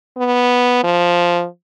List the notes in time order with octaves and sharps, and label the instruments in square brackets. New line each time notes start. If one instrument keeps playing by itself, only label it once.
[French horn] B3
F3